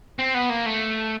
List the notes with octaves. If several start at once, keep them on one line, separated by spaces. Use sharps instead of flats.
C4
B3
A#3
A3